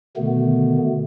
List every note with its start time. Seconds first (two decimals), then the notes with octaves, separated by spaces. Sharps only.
0.17 B2 D3 D#3 A3 B3